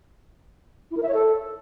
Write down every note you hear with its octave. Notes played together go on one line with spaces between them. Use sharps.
E4
A#4
E5
C#5
A4